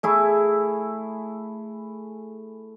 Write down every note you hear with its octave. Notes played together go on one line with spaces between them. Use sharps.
A3 E4 G#4